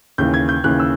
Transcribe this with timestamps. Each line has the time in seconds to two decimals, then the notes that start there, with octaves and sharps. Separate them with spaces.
0.18 D#2 C#3 E3 G6
0.34 G#6
0.49 G6
0.64 D#2 C#3 E3 F#6
0.80 E6